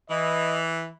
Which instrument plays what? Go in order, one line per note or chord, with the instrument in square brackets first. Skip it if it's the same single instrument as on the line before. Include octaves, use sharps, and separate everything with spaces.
[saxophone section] E3 [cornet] D#5